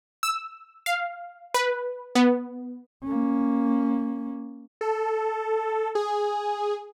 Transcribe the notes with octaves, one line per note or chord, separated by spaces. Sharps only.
E6
F5
B4
B3
A#3 C#4
A4
G#4